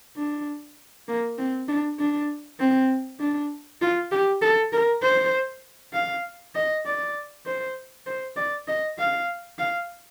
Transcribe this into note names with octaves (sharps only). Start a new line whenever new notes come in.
D4
A#3
C4
D4
D4
C4
D4
F4
G4
A4
A#4
C5
F5
D#5
D5
C5
C5
D5
D#5
F5
F5